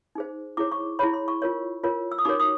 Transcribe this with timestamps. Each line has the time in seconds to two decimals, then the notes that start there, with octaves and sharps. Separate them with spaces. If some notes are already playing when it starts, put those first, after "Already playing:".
0.15 D#4 G#4 C5
0.57 E4 G#4 C#5 D6
0.72 C#6
0.99 E4 G#4 C#5 B5
1.14 C6
1.28 C#6
1.42 F4 A#4 C#5
1.84 F4 A#4 C#5
2.12 E6
2.18 D#6
2.25 D#4 F#4 A#4 C#5 D6
2.40 D#6